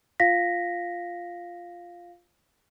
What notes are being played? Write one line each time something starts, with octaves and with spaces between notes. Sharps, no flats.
F4 F5 A#6 B6